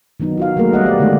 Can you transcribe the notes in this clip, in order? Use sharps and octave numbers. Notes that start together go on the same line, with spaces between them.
D#3 F#3 B3 D#4
F4 F#4 F5
F#3 A3 A#3 G#4 A#4
G3 B3 D#4 D5 D#5 F#5
F3 D5
D3 D#3 G#3 A3 B3 C4